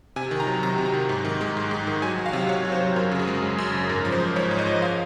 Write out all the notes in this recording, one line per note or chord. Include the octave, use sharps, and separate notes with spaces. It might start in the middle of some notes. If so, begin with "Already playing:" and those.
C3 G#5
D#3
A#5
F#3
C3 A#5
C3
A#5
D#3
G#2
D#3
G#3
G#2
G#2
D#3
F#3 G#5
F#3
F5
C3
C3 C#5
F#3
C5
F#3
F#2 A#4
C#3
G#4
G#3
F#2
F#2
C#3
G#2 A#4
F3
C5
G#3
G#2 C#5
G#2
D#5
F3
F5